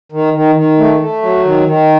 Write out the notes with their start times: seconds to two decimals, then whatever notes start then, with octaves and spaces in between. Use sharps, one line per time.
0.12 D#3
0.34 D#3
0.55 D#3
0.78 A3
1.00 A3
1.22 F#3
1.45 D#3
1.66 D#3